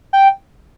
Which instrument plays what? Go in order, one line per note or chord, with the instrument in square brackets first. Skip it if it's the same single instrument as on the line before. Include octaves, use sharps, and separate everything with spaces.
[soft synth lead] G5